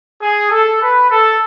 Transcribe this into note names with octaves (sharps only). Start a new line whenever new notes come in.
G#4
A4
B4
A4